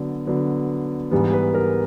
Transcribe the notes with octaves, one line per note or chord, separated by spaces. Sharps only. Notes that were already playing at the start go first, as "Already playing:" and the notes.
Already playing: D3 F#3 B3
D3 F#3 B3
G#2 E3 G3 B3
B4
A#4